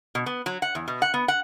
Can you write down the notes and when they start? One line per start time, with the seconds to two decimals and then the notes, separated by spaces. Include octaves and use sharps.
0.15 B2
0.26 B3
0.46 F#3
0.62 F#5
0.75 E2
0.88 B2
1.02 F#5
1.14 B3
1.28 F#5